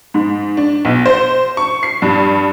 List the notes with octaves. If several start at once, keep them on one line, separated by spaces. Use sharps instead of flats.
G#2
D4
B1
C5
C#6
C7
G2